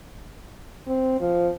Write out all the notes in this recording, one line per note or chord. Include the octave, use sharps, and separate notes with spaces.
C4
F3